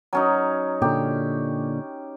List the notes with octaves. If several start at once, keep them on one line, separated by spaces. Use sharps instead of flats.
F#3 C#4 D#4
A#2 D3 G4